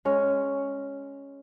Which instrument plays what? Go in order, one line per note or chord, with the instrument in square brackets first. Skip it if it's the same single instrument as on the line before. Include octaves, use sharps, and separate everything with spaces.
[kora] G#3 C#4